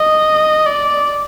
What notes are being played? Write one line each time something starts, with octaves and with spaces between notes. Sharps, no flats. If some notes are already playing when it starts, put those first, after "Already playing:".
Already playing: D#5
D5